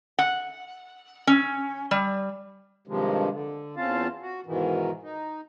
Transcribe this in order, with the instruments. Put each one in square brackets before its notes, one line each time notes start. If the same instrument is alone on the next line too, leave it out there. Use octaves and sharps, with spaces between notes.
[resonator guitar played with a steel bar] F#5
C#4
G3
[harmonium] G2 C3 D#3 F3 G#3
D3
E2 C4 C#4 F4 F5 A5
F#4
G#2 B2 D#3 E3
D#4